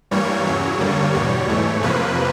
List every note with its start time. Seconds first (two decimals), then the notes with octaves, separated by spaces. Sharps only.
0.11 G2 E3 G3 A#3 C#5
0.46 E2 C#3 F#3
0.79 G2 D3 G3 A#3
1.14 E2 B2 G3 C#5
1.49 G#2 E3 A3
1.83 F2 C3 F3 A#3 B4